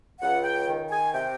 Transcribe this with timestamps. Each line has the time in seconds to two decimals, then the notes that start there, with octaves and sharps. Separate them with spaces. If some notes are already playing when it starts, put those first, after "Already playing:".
0.22 C#2 F#5
0.44 G5
0.67 D#3
0.90 G#5
1.13 C3 G5